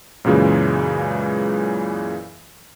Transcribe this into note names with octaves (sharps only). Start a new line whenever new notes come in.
F#2 A#2 C#3 E3 G#3